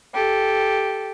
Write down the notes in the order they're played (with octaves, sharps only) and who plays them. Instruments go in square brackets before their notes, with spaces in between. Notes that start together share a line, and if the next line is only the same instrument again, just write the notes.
[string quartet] G4 A4